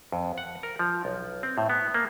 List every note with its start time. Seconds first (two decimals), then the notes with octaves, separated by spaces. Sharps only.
0.12 F2
0.38 F#5
0.63 A#4
0.79 F3
1.05 B1
1.43 C4
1.58 A2
1.70 B3
1.94 A#3